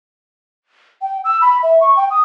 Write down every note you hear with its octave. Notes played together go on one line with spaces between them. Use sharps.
G5
E6
B5
E5
C#6
G5
D#6